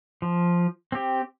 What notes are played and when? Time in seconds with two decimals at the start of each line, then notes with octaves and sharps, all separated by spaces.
0.22 F3
0.92 C4 G4